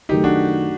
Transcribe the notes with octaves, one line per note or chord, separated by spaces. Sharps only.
F#2 D#3 A3 D#4 G4
D4 F#4